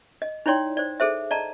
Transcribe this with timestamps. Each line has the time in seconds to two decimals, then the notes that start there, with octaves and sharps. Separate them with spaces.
0.22 D#5
0.46 D#4 E4 C#5 D5 G5 C6
0.77 C5 D5
1.00 G#4 A4 C5 E5
1.31 D5 D#5 A5 A#5